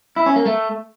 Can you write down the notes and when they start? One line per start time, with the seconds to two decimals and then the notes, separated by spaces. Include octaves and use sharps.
0.16 E4
0.26 C#4
0.36 A#3
0.46 A3